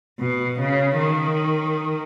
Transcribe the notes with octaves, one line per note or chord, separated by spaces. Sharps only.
B2
C#3
D#3